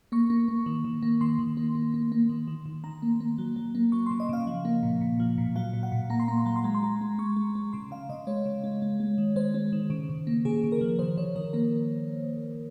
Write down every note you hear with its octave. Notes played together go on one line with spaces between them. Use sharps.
A#3 C#6
A#3
A#3
D#3
D#3
A#3
D#3 C6
D#3
A#3
A#3
A#3
A#3
D#3
D#3
D#3
D#3 A#5
A#3
A#3
F#3
F#3
A#3
F#3 C#6
C#3 C6
D#5
C#3 F5
F3
A#3
A#2
A#2
F3
A#2
F#3 F5
A#2
F#5
A#2
A#3 A#5
C6
A#3 A#5
C6
F#3 A#5
C6
G#3 A#5
C6
G#3 A#5
G#3
G#3 C#6
G#3
G#3
C#3 C6
C#3 F5
C#3 D#5
G#3 C#5
C#3
G#3
G#3
G#3
D#3
G#3 C5
G#3
D#3
C#3
C#3
A#3
C#3 G#4
C#3
A#4
F3
D#3 C5
D#3 C#5
D#3 A#4
A#3 A#4